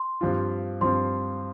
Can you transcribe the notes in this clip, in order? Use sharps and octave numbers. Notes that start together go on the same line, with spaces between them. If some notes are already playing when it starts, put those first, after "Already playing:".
Already playing: C6
G2 F3 C4 F4
G2 F3 C4 F4 C6